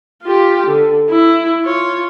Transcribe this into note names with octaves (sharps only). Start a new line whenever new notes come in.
F4 G4
D3
E4
F4 C#5